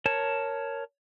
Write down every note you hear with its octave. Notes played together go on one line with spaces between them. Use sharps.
A#4 C#5 A5